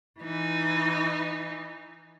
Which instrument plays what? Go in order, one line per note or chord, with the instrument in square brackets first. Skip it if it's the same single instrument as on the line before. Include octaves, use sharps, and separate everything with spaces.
[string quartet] E3 D#4